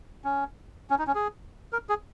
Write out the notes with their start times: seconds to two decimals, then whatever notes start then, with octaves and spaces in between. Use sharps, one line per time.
0.24 C#4
0.90 C#4
0.99 D#4
1.07 C#4
1.15 G#4
1.73 A#4
1.89 G#4